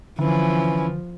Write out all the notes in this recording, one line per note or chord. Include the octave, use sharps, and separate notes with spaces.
D3 E3 F3 C#4 E4